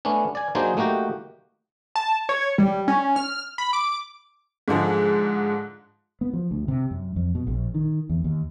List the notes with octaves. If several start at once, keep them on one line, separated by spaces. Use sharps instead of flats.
A3 B3 C#4 D4
D5 G#5
F#3 A#3 D4 D#4 G#4 C5
A3 A#3 D#4 F#4 G4
A5
C#5
G3
C#4
F6
B5
D6
G#2 D3 F3 G#3
B3
F3
D2
C3
F#2
F2
B2
A#1
D#3
E2
D#2